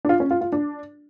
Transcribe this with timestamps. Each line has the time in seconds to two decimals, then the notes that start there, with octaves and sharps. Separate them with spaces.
0.05 D4
0.09 F4
0.20 C#4
0.31 F4
0.41 F4
0.52 D4